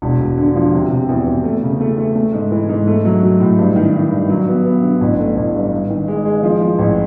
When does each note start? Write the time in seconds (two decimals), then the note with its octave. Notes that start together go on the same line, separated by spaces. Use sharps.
0.02 E1
0.20 E1
0.38 D3
0.56 F3
0.73 C3
0.91 C3
1.09 E2
1.27 E2
1.44 A3
1.63 C#3
1.81 A3
1.98 A3
2.16 A3
2.33 G#2
2.51 E3
2.69 G#2
2.87 A3
3.05 F#3
3.23 F#3
3.40 A2
3.59 G2
3.76 D#3
3.94 D#3
4.11 G2
4.29 F#3
4.48 B3
4.65 B3
4.83 D3
5.01 A1
5.19 A3
5.37 A1
5.54 G2
5.72 G2
5.90 D#3
6.08 G#3
6.25 G#3
6.43 F3
6.61 F3
6.79 A1